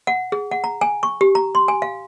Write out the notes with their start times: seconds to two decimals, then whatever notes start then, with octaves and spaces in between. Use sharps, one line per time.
0.07 F#5
0.32 G#4
0.51 F#5
0.64 A#5
0.81 G#5
1.03 C#6
1.21 G4
1.35 A#5
1.55 C6
1.68 G#5
1.82 F5